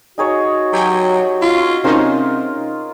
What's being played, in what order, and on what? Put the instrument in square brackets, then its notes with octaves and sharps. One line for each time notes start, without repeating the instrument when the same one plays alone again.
[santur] D#4 G#4 C#5 [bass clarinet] F#4
[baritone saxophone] F#3 [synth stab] G4 G5 G#5
[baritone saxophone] F4
[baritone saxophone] C3 [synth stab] C#4 D#4 C5 [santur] F4 G#4 A#4